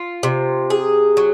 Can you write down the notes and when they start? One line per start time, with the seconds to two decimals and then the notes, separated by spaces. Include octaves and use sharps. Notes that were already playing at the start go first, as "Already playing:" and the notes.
Already playing: F4
0.23 C3
0.70 G#4
1.17 F#3